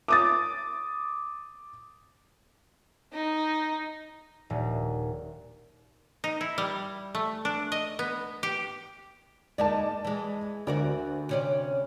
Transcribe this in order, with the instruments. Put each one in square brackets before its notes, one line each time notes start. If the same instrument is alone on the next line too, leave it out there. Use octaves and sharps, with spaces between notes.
[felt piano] D6 D#6 A6
[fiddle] D#4
[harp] D#1
[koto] D#4
E4
G3
A3
D4
D#5
B3
G4
[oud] G#3 A#3 D#4 [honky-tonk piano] D5 A5
[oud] E3 G#3
[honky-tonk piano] D2 [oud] F#4 A#4 D5
[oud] C3 C#4 D5